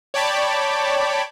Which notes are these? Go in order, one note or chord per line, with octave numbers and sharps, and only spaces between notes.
C#5 D5 G5 A5 B5 D6